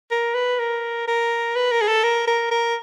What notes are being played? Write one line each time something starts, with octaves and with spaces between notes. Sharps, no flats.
A#4
B4
A#4
A#4
B4
A#4
G#4
A4
A#4
A#4
A#4